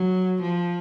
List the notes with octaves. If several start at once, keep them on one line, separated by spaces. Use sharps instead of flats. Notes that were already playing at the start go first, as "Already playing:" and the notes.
Already playing: F#3
F3